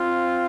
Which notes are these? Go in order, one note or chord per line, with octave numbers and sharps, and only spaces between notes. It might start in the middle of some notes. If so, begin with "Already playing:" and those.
Already playing: C4 F4